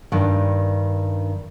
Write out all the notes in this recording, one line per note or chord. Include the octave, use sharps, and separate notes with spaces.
G2 D#3